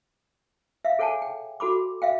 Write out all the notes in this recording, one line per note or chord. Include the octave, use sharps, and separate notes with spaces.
E5 F5
G#4 A4 C#5 F#5 G#5 A5
G5
F#4 A4 B5 D6
E5 F5 G5